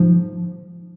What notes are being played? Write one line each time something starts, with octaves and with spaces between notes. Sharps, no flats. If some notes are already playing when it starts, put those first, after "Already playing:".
Already playing: G#2 F3